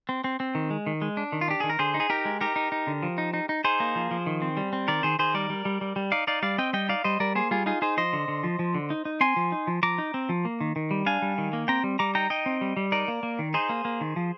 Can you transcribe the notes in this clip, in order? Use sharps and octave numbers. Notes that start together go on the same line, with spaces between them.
C4
C4
C4
D#3
G#3
D#3
G#3
D4
D#3
F4
D4 G4
D#3 G#4
A#4
D3 G#4 C5
D#4
G#4
D#4 G4 A#4
G#3
D#4 G4 A#4
D#4
D#4
D3
F3
D#4
D#4
D#4
D#4 G#4 C5
A#3
F3
F3
D#3
C4
G3
C4
D#3 A#4 D5
D#3 G#4 C5
D#3 G#4 C5
G3 A#4 D5
G3
G3
G3
G3
D#4 D5 F5
D#4 D5 F5
G3 D5 F5
C4 D#5 G5
G3 D#5 G5
D#4 D5 F5
G3 C5 D#5
G3 A#4 D5
A#3 G#4 C5
G3 F4 G#4
D#4 F4 G#4
D#4 G#4 C5
F3 C5 D#5
D3
D3
F3
F3
D3
D#4
D#4
C4 G#5 C6
F3
D#4
F3
F3 A#5 D6
D#4
C4
F3
A#3
D#3
D#3
G3
D4 F5 G#5
G3
D#3
A#3
C4 G5 A#5
G3
G3 A#5 D6
D#4 G5 A#5
D#4 D#5 G5
C4
G3
G3
D#4 A#4 D5
A#3
A#3
D#3
D#4 G#4 C5
A#3
A#3
D#3
F3